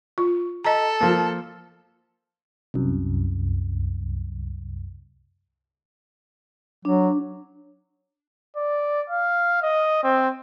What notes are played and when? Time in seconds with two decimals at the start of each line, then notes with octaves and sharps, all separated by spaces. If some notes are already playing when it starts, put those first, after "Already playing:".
0.18 F4
0.64 A4 D#5 A#5
1.01 F3 A#3
2.74 C2 F#2
6.85 F#3 D4
8.57 D5
9.10 F5
9.63 D#5
10.04 C4